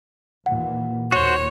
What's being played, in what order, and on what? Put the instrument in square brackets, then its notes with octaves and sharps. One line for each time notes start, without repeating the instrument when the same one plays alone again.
[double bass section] D#2 A#2 E3 [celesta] F#5
[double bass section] D#2 A#2 [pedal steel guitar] F#4 C5 [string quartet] C#5